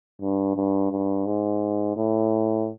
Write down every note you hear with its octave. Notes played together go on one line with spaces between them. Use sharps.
G2
G2
G2
G#2
A2